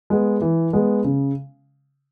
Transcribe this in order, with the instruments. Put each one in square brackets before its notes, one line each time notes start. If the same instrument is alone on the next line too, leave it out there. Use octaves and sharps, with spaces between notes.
[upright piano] G#3 B3
E3
G#3 B3
C#3